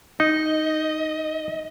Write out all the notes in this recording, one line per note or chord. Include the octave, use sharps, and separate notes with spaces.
D#4 D#5